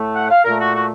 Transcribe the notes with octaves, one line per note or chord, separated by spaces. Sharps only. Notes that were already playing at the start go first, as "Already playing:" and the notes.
Already playing: A2 A3
F#5
F5
A#2 A3 A#4
F#4
F#4